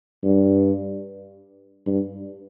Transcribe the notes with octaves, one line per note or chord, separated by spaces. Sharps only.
G2
G2